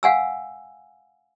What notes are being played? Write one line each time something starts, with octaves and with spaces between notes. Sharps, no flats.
F5 F#5 G#5 E6